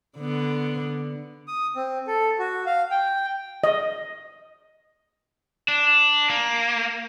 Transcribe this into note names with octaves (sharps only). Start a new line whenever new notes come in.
D3 B3
D#6
C4
A4
F#4
F5
G5
D#5
D4
A#3